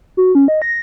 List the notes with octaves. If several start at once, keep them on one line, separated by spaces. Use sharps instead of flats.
F#4
C#4
D#5
A#6